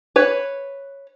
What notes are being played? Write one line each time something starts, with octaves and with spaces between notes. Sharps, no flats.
B4 C#5